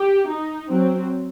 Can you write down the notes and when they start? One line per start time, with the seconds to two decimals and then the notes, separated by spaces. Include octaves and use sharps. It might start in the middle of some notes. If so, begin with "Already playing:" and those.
Already playing: G4
0.29 D#4
0.70 F#3 C4